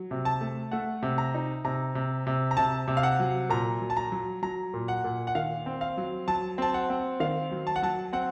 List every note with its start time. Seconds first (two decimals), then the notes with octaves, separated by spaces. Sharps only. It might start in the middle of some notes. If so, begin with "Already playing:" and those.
Already playing: F#3
0.11 C3
0.25 A5
0.41 A3
0.71 A3 F#5
1.03 C3
1.18 A#5
1.34 D#4
1.64 C3 A#5
1.95 C3
2.27 C3
2.51 A#5
2.57 C3 A5
2.88 C3
2.97 F5
3.03 F#5
3.20 F#3
3.50 A#2 A#5
3.81 F#3
3.90 A5
3.97 A#5
4.12 F#3
4.43 F#3 A#5
4.74 A#2
4.88 F#5
5.04 A#2
5.27 F#5
5.35 D#3 F5
5.66 C4
5.81 F5
5.97 F#3
6.28 F#3 A5
6.58 C4 A5
6.74 F#5
6.89 C4
7.20 D#3 F5
7.51 F#3
7.67 A5
7.76 F#5
7.82 F#3 A5
8.13 C4 F#5